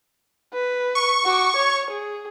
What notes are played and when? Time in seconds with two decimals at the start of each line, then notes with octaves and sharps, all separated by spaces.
0.54 B4
0.95 C#6
1.25 F#4 D6
1.56 C#5
1.91 G#4